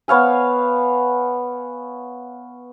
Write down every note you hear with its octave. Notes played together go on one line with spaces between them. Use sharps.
B3 C#5 F5 G#5